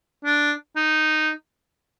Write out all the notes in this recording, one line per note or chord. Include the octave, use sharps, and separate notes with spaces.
D4
D#4